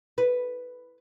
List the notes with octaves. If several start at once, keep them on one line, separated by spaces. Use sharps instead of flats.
B4